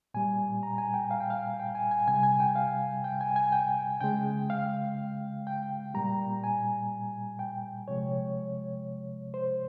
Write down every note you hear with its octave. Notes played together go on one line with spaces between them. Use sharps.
A#2 G3 G#5
A#5
G#5
G5
F5
G5
F5
G5
G#5
G#5
C3 G3 G#5
G#5
G5
F5
G5
G#5
G#5
G5
C#3 G#3 G5
F5
G5
A#2 G3 A#5
G#5
G5
C3 F3 G#3 C#5
C5